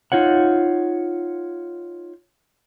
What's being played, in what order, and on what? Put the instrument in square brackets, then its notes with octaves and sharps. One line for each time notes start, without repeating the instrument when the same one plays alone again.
[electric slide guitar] D#4 F4 C#5 F#5